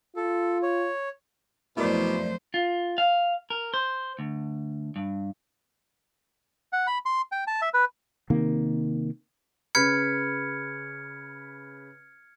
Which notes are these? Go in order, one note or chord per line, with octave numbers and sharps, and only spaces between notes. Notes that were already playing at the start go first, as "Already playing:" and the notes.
F4 A4
C#5
F2 B2 F#3 A3 E4 A#4 C5 D5
F4
F5
A#4
C5
D2
G2
F#5
B5
C6
G5
A5
E5
B4
C3 D#3 A#3
C#3 B4 B5 F6 G#6 C#7